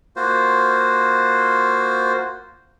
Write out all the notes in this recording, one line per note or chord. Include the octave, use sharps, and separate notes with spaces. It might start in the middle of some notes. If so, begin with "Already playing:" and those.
A#3 F4 F#4 C5